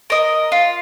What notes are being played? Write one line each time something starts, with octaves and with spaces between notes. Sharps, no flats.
A#4 D#5
F4